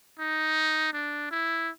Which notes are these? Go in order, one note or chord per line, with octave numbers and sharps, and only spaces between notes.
D#4
D4
E4